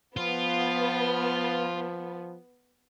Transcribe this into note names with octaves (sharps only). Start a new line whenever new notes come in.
F3 B3 F4